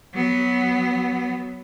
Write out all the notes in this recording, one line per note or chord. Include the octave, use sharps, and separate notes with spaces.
F#3 B3